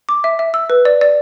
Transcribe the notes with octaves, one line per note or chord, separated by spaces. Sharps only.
D6
E5
E5
E6
B4
D5
D5